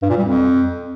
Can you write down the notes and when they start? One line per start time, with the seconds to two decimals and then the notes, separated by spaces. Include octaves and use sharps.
0.02 G2
0.10 A#2
0.17 G3
0.25 F2